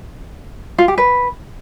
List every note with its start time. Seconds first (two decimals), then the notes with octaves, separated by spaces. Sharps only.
0.78 F4
0.88 G4
0.98 B4